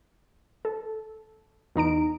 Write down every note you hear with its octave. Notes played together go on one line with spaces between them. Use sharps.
A4
E2 D#4 A#5 D7